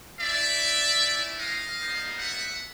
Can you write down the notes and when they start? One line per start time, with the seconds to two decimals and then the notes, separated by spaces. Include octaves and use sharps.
0.19 A3 C#4 E4 D5 E5
0.99 A3 C#4 E4
1.39 D#5 F5
1.78 G3 B3 D#4
2.18 E5 F#5